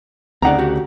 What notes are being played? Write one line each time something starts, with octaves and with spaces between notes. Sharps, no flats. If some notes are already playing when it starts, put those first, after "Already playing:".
D2 C#3 C4 D#4 D5 F#5 A#5
F#4 G4